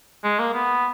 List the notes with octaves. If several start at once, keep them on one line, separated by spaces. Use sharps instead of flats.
G#3
A#3
B3